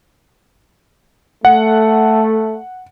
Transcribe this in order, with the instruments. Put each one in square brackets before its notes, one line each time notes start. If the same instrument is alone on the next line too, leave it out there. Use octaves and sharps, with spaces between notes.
[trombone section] A3 [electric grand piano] F#5